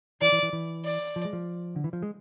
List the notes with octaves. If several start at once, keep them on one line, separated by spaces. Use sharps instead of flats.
E3 D5
E3
E3
E3
D5
F3
G#3
F3
D3
E3
F3
G#3